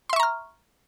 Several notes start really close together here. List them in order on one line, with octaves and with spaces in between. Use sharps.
C6 E5 C#6 A#5 F6